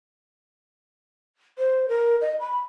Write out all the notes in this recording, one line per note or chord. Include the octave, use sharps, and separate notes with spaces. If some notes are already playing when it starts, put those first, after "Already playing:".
C5
A#4
D#5
B5